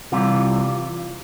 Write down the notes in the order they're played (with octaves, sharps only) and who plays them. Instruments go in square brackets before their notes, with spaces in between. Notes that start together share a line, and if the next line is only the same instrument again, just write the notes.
[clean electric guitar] C3 E3 G3 F4